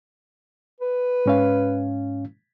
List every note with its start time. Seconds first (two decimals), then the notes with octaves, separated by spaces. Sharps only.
0.81 B4
1.26 G#2 C#4 F5